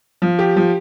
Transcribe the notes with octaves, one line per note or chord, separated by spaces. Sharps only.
F3
G4
F3